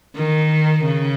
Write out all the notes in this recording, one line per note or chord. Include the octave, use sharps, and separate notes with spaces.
D#3
C#3